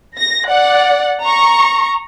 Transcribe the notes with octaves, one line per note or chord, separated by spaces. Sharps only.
A#6
D5 F#5
A#5 C#6